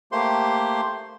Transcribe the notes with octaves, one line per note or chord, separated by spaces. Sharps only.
A3 A#3 G4 C5 C6